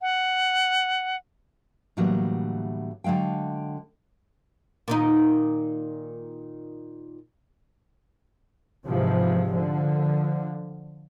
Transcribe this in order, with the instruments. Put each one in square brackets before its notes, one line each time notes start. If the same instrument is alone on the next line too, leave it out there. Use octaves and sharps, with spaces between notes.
[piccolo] F#5
[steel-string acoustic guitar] A2 D3 E3 F#3 G3 A#3
D3 F#3 G#3 F5 G5
[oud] A#2 D#3 D#4
[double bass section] G#2 C3 E3 F3
D3 F3